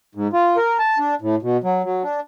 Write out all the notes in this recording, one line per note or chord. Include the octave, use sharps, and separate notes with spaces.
G#2
F4
A#4
A5
D4
A2
B2
F#3
F#3
D4